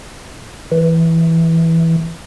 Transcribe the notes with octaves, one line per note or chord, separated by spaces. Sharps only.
E3